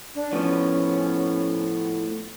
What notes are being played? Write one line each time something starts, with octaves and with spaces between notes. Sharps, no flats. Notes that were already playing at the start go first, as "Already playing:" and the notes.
D4
A2 F3 B3 C#4